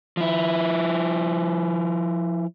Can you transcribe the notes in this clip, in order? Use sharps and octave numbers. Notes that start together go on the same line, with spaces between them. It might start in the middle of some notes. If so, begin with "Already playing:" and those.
F3 E4